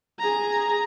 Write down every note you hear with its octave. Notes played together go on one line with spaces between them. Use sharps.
G#4 A#5